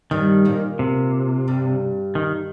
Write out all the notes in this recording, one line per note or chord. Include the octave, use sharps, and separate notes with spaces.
G2 D#3 G3
A#2 A#3
C3
G2 G3
D#3